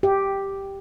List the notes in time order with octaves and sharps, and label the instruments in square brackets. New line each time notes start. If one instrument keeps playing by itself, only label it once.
[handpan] G4